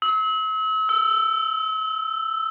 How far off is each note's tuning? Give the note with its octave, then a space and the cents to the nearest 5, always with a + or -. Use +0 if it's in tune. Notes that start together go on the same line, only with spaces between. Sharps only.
E6 -40
E6 +5